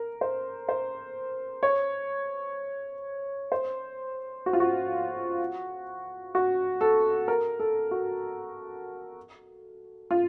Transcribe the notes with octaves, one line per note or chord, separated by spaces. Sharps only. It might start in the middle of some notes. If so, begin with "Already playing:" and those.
Already playing: A#4
C5
C5
C#5
C5
F#4
F4
F#4
F#4
A4
A#4
A4
F#4
F4